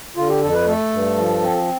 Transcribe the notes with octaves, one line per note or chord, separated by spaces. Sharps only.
D3 F4
G4
F2 A4
B4
A3 A4
G2
F3
C4